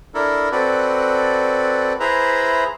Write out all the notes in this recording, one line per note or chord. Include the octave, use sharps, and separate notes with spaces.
D4 E4 A4 A#4
C4 F#4 A4 B4 D5
E4 G#4 B4 C5 E5 A#5